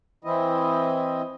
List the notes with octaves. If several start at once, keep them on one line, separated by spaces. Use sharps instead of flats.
E3 C4 E4 D#5